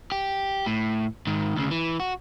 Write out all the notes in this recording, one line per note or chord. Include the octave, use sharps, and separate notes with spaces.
G4
A2
G#2 D#3
D2 C#3
E3
F#4